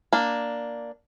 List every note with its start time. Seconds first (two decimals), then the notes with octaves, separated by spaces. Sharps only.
0.13 A#3 D4